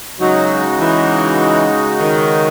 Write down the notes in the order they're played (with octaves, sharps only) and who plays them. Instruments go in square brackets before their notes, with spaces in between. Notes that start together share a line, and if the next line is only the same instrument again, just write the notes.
[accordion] C#3 G#3 D#4 F#4 [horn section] F#3
[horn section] E3
D#3